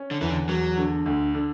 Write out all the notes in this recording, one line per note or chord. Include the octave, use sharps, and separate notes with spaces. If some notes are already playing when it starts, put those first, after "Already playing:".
Already playing: C#4
D3
E2 E3
D3
E2 F#3
D3
D2
D3